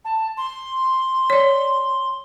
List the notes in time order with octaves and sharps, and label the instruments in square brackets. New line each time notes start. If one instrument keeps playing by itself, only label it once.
[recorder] A5
C6
[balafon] C#5 D5